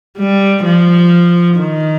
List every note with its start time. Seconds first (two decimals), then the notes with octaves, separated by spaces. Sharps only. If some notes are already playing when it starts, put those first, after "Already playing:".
0.18 G3
0.65 F3
1.59 D#3